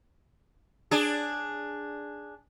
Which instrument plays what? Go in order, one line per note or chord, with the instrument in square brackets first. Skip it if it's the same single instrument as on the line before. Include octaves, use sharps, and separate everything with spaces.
[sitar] D4 G#4